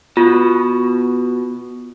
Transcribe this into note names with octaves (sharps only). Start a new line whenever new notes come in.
B2 F4